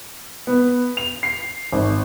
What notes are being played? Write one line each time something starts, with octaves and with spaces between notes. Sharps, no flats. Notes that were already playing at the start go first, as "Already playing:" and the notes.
B3
F7
C7
G#1